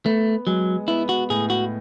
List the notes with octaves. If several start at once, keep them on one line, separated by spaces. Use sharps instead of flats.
A3 B3
F#3 G#3
B3 E4
F#4
A2 G#4
F#4